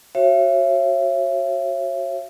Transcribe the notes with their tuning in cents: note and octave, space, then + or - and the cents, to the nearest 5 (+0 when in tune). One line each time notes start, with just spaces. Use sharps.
F#4 +10 C#5 -35 E5 +40